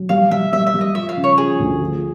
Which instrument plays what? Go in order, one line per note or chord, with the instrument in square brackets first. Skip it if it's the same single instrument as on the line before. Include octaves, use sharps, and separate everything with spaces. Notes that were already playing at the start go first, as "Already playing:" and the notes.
Already playing: [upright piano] F#3
[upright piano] G3 [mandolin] F5
[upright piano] G3 [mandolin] E5
[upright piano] G3 [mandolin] E5
[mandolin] E5
[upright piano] G3
[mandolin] D#5
[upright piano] F3 [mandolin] E5
[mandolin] F5
[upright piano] C#3
[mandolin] C#5
[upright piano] F3 [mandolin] G#4
[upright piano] D2
F3